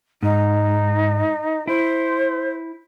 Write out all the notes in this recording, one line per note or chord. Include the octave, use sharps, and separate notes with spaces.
G#2 D#4
E4 C5